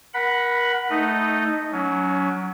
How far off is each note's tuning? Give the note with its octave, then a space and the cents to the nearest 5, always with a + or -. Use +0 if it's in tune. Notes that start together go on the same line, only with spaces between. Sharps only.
A#4 +35 F#5 +0 B5 +0
A3 +0 D#4 +0 D#5 -15
F#3 +0 C#4 +25